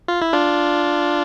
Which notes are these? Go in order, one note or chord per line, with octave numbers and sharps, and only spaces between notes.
F4
E4
D4 F4